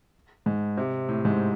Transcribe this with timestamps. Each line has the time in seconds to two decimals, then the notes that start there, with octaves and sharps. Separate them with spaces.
0.46 G#2
0.77 C3
1.09 A2
1.25 G#2